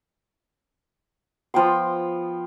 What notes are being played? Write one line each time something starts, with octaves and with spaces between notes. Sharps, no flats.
F3 B3 G5 C6